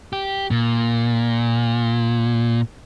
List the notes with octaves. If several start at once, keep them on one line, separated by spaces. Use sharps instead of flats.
G4
A#2